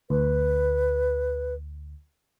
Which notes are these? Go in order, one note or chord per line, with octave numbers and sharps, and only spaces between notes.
D2 B4